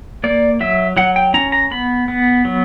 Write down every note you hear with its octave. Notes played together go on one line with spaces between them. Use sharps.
A#3 D5
F#3 E5
F#3 F#5
G5
C#4 A#5
A#5
B3 B5
B3
F#3